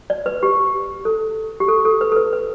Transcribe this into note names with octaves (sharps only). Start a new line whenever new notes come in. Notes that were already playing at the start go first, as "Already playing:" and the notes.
D5
B4
G4
A4
G4
A4
A4
B4
A4
B4
B4